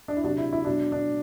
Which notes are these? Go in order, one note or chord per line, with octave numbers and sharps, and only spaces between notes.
D4
E4
C3 F#3 D4 F#4
E4
E4
B2 F#3 D4
D4